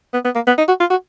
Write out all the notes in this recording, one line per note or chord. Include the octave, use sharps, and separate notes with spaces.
B3
B3
A#3
B3
D#4
F#4
F4
F#4